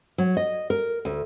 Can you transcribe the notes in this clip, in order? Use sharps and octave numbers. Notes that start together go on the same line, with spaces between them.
F#3
D#5
A#4
D2